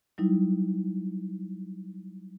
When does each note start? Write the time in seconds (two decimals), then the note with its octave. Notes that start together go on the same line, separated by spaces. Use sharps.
0.18 F#3 G3 D#4 E4